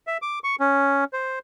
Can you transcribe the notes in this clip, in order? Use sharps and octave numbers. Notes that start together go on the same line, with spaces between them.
E5
D6
C#6
C#4
C5